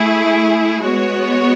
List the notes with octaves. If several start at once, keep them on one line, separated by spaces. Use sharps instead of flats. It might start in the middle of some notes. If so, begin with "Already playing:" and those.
Already playing: A3 E4 G#4
G#3 B3 F#4 C#5